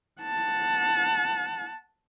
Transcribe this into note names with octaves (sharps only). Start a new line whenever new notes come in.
F#5 A5